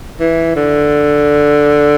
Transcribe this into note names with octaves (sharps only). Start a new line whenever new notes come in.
E3
D3